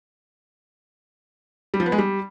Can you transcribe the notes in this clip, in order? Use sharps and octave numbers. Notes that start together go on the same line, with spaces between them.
G3
F3
B3
G#3
G3